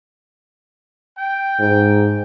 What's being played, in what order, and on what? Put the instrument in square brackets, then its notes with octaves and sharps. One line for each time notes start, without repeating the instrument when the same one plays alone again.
[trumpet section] G5
[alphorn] G#2